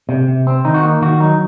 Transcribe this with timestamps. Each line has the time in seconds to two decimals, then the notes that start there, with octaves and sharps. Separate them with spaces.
0.09 C3
0.28 C3
0.47 C4
0.65 D#3 D#4
0.74 F#4
0.83 A#3 D#4
1.01 D#3 F#4
1.20 F#3 D#4